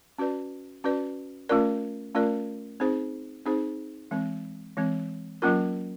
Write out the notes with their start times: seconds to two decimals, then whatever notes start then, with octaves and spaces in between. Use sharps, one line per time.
0.18 C#4 F#4 B4 D5
0.84 C#4 F#4 B4 D5
1.49 A3 C#4 F4 A#4 D5
2.15 A3 C#4 F4 A#4 D5
2.80 C4 D#4 G#4 C5
3.46 C4 D#4 G#4 C5
4.11 E3 G#3 C4
4.77 E3 G#3 C4
5.42 F#3 A#3 C#4 F4 A#4